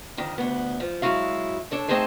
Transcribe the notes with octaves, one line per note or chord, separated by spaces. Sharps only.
F2 D3 D#3
D2 B3
F3
F#3 G#3 D#4 E4 F#4 F5
D4 A4 C#5
A3 C4 D#4 G#4 C5 A5